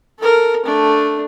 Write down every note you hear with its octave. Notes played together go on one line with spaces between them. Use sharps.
A4 A#4
A3 D4